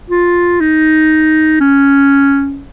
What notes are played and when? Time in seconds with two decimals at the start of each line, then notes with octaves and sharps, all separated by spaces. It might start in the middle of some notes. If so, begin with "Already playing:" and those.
0.11 F4
0.61 D#4
1.60 C#4